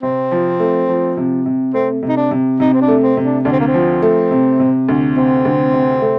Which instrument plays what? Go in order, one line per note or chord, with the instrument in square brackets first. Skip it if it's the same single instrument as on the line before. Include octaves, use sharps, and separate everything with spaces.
[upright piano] C3 [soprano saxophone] C4
[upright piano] F3
A3
F3
C3
C3
[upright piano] A3 [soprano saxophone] C4
[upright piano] C3
[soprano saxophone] D#4
D4
[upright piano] C3
[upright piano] C3 [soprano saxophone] D#4
[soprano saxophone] C4
D4
[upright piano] A3
[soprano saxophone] C4
[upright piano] C3
[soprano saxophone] D4
[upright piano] D2 [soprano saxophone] D4
[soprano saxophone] C4
A#3
C4
[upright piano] F3
A3
C3
C3
D2
[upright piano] C3 [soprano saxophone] C4
[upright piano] D2
C3
A3